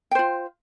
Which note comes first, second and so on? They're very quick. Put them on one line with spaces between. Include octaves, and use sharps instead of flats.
G5 C5 F4